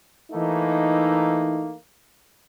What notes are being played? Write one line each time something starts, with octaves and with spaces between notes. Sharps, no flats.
E3 A3 A#3 D#4